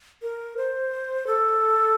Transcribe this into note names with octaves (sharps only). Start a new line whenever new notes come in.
A#4
C5
A4